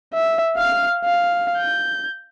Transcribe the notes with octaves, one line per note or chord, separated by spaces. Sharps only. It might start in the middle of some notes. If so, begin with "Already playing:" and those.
E5
F5 F6
F5
G6